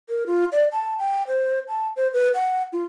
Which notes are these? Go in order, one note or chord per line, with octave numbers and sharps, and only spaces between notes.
A#4
F4
D5
A5
G5
C5
A5
C5
B4
F#5
F4